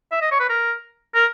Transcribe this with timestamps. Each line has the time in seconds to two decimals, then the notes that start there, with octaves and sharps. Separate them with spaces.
0.12 E5
0.21 D#5
0.31 C#5
0.40 B4
0.49 A#4
1.15 A#4